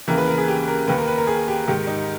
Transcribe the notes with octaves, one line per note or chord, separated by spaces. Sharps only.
D#2 C#3 E3 A#4
B4
A#4
G#4
G4
A#4
D#2 D#3 B4
A#4
B4
A#4
G#4
G4
G#2 D#3 G4
D#4